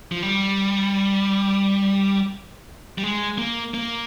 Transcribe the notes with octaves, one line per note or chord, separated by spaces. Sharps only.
F3
G3
G3
G#3
A#3
A#3